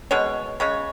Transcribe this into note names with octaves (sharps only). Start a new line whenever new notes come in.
B2 G#3 C#5
C#3 G#3 C#5